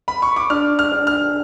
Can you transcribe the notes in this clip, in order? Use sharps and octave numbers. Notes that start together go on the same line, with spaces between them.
B5
C#6
D6
D4 F6
F6
D4
F6